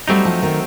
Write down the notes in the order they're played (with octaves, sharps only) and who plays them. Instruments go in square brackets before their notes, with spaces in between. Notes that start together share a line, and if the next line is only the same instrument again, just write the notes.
[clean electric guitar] F#3 A3 C4 D#4 [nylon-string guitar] G3
[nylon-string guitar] F3
D#3